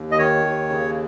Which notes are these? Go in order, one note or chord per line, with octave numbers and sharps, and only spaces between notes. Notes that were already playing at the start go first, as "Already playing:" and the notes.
Already playing: D#2
D#5
D#3 C#5
D#2
C#3